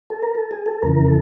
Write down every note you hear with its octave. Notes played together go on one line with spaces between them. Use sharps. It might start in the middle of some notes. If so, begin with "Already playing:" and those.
A4
A#4
A4
G#4
A4
F2 C#3 E3 A#4
A4